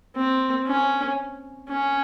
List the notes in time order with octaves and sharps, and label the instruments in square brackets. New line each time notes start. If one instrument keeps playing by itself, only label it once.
[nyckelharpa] C4
C#4
C#4